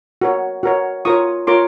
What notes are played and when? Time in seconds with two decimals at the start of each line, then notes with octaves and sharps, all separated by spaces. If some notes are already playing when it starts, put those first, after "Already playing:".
0.22 F#4 A#4 C#5
0.63 F#4 A#4 C#5
1.05 F4 A#4 C#5 C#6 D#6
1.47 F4 A#4 C#5 C6 D6